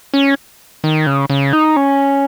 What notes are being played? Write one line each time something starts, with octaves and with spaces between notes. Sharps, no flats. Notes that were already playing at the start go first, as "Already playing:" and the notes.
C#4
D#3
C#3
C#3
D#4
C#4